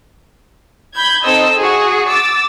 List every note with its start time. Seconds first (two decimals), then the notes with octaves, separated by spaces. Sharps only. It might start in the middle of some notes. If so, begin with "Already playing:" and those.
0.94 B5 G6 G#6
1.24 C4 D#4 A4 C5 D#5 E6
1.58 F#4 G#4
2.07 D6 E6 A6